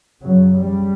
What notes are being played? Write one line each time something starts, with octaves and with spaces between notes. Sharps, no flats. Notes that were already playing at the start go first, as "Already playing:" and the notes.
F#2 C#3 F#3
G3